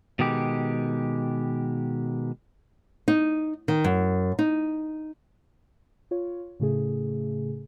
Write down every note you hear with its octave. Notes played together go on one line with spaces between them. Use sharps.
B2 D#3 G#3 G4
D#4
D#3
F#2
D#4
F4 C#5
A2 C#3 A3 G#4